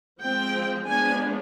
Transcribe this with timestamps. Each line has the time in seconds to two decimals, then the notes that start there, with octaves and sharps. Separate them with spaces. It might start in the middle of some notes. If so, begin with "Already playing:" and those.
0.20 F3 G#3 C4 G5
0.86 F3 G#3 B3 D4 G#5